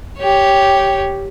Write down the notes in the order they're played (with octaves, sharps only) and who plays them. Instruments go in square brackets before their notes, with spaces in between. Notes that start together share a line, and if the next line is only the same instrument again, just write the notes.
[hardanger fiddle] G4 C#5